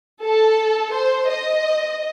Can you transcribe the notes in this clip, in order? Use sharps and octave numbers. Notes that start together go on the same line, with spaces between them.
A4
C5
D#5